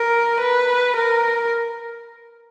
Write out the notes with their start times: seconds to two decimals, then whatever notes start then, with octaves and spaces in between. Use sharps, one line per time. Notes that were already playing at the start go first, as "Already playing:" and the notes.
Already playing: A#4
0.40 B4
0.96 A#4